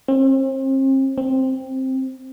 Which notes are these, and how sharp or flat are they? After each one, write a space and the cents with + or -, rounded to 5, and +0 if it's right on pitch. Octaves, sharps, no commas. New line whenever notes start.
C4 +40
C4 +5